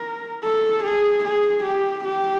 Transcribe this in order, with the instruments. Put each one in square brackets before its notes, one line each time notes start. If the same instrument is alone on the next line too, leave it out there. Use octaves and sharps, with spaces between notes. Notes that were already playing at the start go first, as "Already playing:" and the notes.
Already playing: [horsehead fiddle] A#4
A4
G#4
G#4
G4
G4